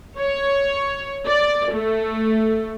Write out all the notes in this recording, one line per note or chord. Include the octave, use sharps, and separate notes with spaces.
C#5
D5
A3